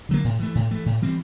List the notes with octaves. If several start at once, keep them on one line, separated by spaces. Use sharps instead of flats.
D3 F#3 A#3
A2
E3 A3
A2
E3 A3
A2
E3 G3 C4